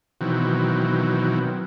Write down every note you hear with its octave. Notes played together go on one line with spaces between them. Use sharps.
B2 D#3 E3 F#3 C4